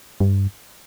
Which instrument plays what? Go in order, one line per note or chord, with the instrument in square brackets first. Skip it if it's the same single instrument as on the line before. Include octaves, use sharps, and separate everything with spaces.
[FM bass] G2